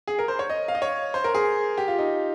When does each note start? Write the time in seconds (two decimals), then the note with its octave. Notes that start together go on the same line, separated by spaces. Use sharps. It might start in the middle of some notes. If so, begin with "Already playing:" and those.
0.08 G#4
0.19 A#4
0.28 C5
0.39 C#5
0.50 D#5
0.68 F5
0.75 D#5
0.82 C#5
1.14 C5
1.24 A#4
1.35 G#4
1.78 G4
1.88 F4
1.98 D#4